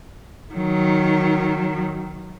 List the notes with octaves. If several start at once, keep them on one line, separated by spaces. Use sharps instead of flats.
D#3 F#3